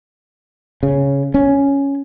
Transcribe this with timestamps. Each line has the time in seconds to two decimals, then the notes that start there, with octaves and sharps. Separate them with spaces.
0.83 C#3
1.34 C#4